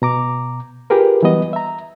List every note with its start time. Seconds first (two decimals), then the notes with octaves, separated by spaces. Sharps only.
0.02 B2 A#5 D6
0.90 F4 G4 G#4 A#4 B4
1.23 E3 F#3 G3 B3 D#5
1.53 E5 A#5